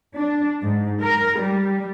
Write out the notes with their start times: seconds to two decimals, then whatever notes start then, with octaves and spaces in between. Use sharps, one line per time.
0.15 D4
0.63 G#2
1.01 A#4
1.40 G3